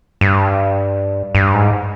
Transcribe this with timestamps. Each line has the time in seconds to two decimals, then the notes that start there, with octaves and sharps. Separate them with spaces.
0.21 G2
1.35 G2
1.54 G#2